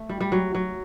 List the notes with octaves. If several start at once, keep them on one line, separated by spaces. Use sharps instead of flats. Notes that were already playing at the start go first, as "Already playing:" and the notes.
Already playing: A3
G3
G3
F#3
F#3